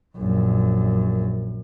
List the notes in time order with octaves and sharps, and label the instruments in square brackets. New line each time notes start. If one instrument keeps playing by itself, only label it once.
[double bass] A#1 F#2